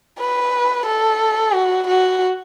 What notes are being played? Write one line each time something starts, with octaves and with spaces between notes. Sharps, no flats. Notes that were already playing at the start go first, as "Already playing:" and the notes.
B4
A4
F#4
F#4